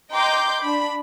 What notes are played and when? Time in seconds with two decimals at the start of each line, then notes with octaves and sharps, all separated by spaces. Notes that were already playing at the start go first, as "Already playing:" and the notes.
0.12 D#5 G5 A#5 C6 D6 G6
0.62 D4 B5